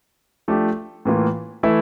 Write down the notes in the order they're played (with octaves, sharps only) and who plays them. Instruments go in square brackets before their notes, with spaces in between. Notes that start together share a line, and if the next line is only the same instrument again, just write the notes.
[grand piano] F3 A3 D4 G4
A2 E3 A#3 F4
E3 A3 E4